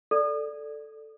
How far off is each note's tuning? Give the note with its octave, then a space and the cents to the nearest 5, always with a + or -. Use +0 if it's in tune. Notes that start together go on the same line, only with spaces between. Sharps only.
A4 +0 D5 +0